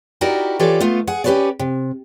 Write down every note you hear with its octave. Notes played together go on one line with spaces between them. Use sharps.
D#4 E4 F#4 G4 A#4 D5
E3 F4 G4 A4 C#5 D5
A3 B3 F4
G#4 F#5
C#4 G4 G#4 B4 C#5 D5
C3